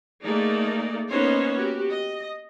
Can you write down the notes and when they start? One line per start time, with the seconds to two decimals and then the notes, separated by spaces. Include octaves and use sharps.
0.23 A3 A#3 D#4 G#4 D5
1.10 A#3 B3 C#4 D#4 C5 C#5
1.57 F#4 G4
1.90 D#5